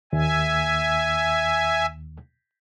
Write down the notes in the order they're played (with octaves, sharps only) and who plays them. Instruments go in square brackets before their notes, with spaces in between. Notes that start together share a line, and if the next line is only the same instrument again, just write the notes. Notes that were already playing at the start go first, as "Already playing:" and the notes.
[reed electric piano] D#2 [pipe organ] E5 G#5